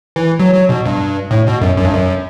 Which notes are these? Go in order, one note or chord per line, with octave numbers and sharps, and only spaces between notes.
E3
F#3
F#3
B2
G2
A2
B2
F#2
F#2
G2
F#2